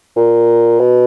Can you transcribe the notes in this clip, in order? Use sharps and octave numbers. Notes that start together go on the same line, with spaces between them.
A#2
B2